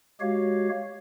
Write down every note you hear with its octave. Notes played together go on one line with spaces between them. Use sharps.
G#3 F#4 G4 C#5 F5